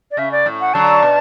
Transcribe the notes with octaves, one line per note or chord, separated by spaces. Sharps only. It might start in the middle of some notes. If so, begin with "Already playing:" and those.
D5
C#3 E5
D5
A2
F#5
D3 F#3 A5
B2